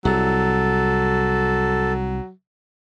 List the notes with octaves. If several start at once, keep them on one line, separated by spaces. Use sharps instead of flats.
C2 F#3 A4